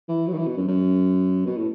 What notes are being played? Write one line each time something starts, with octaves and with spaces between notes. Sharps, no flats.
E3
F#3
D#3
E3
B2
F#2
F#2
B2
A2